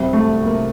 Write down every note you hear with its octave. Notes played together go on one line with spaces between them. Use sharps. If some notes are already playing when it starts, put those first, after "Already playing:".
Already playing: C2 C3 G3
A3
A#3